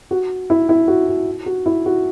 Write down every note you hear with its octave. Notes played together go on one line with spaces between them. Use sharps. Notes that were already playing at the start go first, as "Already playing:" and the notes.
F#4
E4
E4
F#4
F#4
F#4
E4
F#4